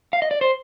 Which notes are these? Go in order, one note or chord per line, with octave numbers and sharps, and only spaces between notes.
F5
D#5
D5
C5